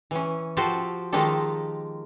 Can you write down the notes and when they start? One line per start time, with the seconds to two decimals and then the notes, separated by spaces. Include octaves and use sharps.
0.11 E3 C#4
0.57 F3 F#4 G4 A4 C5
1.13 D#3 F3 G#3 A#3 G4 A4